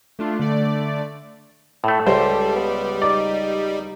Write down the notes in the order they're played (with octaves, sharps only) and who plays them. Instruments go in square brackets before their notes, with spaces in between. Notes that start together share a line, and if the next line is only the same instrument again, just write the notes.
[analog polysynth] A3 D4 F4
D3 A3 D5
[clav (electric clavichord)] A2 A3 [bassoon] A4
[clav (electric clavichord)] C#2 [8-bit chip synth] G3 [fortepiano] C5
[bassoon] B3
[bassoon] D#4 [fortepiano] D5